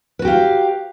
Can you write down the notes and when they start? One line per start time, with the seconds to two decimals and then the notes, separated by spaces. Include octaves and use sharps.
0.19 B4
0.22 F#4
0.25 G4
0.27 F5